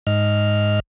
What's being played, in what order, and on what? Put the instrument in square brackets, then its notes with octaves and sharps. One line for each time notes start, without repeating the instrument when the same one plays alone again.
[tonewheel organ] G#2 D#5 F6